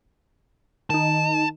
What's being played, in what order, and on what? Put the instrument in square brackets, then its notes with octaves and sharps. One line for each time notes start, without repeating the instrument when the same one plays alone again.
[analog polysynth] D#3 D#4 [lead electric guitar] A5